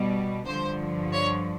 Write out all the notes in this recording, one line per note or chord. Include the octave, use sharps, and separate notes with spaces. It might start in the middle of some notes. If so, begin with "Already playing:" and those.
Already playing: B2 G3
G2 D3 F3 C5
C#5